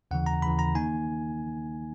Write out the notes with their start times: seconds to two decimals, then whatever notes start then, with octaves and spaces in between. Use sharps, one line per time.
0.11 D#2 C#3 E3 F#5
0.26 A#5
0.42 D#2 C#3 E3 B5
0.59 A#5
0.75 D#3 A#3 D#4 G#5